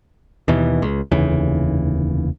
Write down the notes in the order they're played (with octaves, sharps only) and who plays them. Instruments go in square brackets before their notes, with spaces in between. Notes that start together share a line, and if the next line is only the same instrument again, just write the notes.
[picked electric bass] D#2 B2 E3
C#2
F1 D#2 C#3 E3